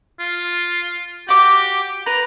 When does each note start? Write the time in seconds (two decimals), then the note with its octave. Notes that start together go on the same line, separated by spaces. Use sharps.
0.19 F4
1.28 F#4 G4 D6
2.06 B4 A#5